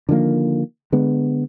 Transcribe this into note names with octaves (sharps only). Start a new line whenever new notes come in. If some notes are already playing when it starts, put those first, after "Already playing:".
D3 D#3 F3 A#3
D3 G#3 B3